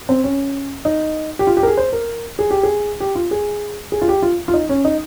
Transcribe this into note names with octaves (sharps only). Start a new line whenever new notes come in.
C4
C#4
D#4
G4
F4
G4
A#4
G#4
C5
A#4
G#4
G4
G#4
G4
F4
G#4
G#4
F4
G4
F4
F4
D#4
C#4
D#4